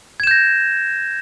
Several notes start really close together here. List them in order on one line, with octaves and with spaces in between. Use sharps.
G#6 E7 G6 A#6